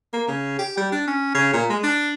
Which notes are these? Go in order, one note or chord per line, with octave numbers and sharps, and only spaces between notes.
A#3
C#3
G4
G3
D4
C#4
C#3
A#2
G#3
D4